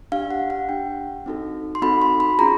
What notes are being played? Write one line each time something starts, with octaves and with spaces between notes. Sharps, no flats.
D4 G4 F5
F#5
F#5
D4 G4 G5
C4 D#4 F#4 A4
C6
C4 D#4 F#4 A4 B5
C6
B5
C#4 F4 G#4 A#5